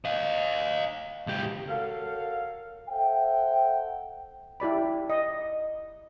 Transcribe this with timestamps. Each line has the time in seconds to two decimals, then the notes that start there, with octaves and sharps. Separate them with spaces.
0.05 D#5 F5
1.27 C#2 G4
1.69 F#4 A4 A#4 C#5 F5
2.89 A4 C5 E5 F#5 G5
4.60 E4 G4 D5 B5
5.10 D#5